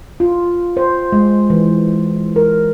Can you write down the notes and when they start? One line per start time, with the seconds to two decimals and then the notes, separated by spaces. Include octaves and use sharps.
0.20 F4
0.77 C5
1.12 G#3
1.50 E3
2.36 A#4